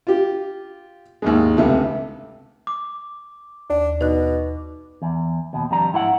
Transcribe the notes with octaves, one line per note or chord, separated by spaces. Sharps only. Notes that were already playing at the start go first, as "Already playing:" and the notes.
F4 G4
D#2 G#2 G#3
C#2 C3 A3
D6
D#2 D4
B2 D#4 F#6
E2
D#2 B2
F2 G3 D4 A#5
G#2 E4 A4 F#5